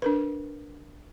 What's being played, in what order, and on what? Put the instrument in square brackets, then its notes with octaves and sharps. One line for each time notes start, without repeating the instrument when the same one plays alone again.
[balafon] D4 A#4 B4